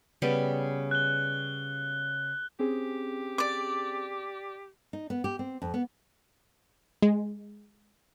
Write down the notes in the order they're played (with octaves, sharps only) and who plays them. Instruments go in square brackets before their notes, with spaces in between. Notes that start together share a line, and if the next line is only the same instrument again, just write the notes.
[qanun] C#3 G3 B3
[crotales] F#6 G7
[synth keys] C4 C#4 G#4 [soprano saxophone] G4
[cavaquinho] D5 D6
[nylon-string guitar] D#4
B3
G4
C4
F2
B3
[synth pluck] G#3